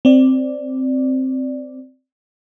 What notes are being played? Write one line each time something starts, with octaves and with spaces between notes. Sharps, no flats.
C4 D5